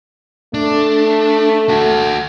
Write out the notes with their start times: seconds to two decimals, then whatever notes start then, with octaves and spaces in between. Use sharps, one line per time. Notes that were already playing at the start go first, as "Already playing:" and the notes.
0.54 A3 D4
1.69 F#4 A4